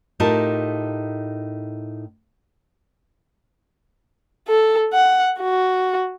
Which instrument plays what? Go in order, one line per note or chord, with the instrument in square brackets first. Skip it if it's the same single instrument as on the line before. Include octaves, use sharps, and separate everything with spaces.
[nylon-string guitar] A2 D#4 F4 G4 A#4 A5
[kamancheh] A4
F#5
F#4